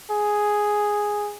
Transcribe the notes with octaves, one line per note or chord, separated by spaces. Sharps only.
G#4